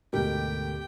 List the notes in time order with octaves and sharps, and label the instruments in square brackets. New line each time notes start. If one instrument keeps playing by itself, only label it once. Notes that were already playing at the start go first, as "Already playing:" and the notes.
[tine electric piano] D2 D3 A#4 [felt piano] G#2 B2 A3 [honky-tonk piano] G4 [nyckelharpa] G5